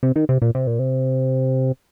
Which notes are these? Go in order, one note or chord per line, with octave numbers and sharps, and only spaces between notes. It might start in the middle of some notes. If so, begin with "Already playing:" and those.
C3
D#3
C3
A#2
C3
A#2
C3